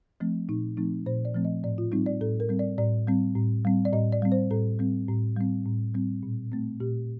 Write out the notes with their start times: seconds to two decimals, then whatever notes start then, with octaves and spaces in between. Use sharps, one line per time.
0.20 F3 A3 C4
0.49 A#2 D#4
0.77 F3 A3 C4 D#4
1.06 A#2 C5
1.25 D5
1.34 F3 A3 C4
1.45 D#5
1.64 A2 D5
1.78 F4
1.92 G3 C4 D#4
2.06 D5
2.21 A2 A4
2.40 A#4
2.49 G3 C4
2.59 D5
2.78 A2 D5
3.07 G3 C4
3.36 A2
3.65 G3 C4
3.85 D5
3.93 A2 D#5
4.12 D5
4.22 G3 C4
4.32 C5
4.51 A2 A4
4.79 G3 C4
5.09 A2
5.37 G3 C4
5.65 A2
5.94 G3 C4
6.23 A#2
6.52 A3 C4
6.80 A#2 G4